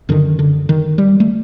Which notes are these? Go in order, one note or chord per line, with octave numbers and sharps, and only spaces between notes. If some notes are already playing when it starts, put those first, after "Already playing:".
F#2 D3 D#3
D3
D#3
G3
A3